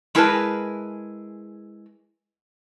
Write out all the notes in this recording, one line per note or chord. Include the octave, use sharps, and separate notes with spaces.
G#3 E4 G#4 A#4 B4 A5